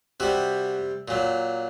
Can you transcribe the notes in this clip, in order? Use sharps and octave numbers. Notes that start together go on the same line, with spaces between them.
C3 G3 F#4
A#2 F#3